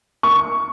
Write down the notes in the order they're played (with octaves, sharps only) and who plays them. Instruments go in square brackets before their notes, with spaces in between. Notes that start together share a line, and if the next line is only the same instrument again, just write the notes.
[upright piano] C#6